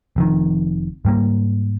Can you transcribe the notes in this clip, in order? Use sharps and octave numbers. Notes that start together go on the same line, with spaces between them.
F1 F2 D#3
G#2 G3 A#3